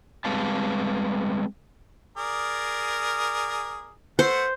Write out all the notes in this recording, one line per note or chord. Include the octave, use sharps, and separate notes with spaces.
G3 G#3 C4 B4 F5 A5
G#4 A#4 D5
A3 C5 F#5